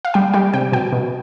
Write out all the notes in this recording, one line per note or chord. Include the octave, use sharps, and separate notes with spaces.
F5
G3 G5
G3 G5
C3 G5
B2 G5
B2